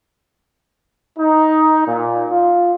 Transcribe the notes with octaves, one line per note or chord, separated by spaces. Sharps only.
D#4
A#2
F4